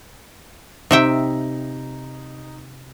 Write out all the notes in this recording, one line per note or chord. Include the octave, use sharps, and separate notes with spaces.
C3 D#4 E5 G5